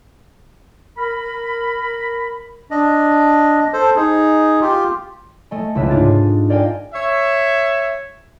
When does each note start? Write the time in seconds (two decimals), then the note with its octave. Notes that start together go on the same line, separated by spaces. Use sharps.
0.98 A#4 B5
2.71 D4 D#5
3.73 A4 C5
3.96 D#4 G#4
4.61 F4 G4
5.51 A3 D#5 G#5
5.75 C#2 C3 B4 E5
5.90 G#2 D4 F4 A6
6.02 G#4
6.49 A#4 D5 D#5 F5 G5 G#5
6.94 C#5 E5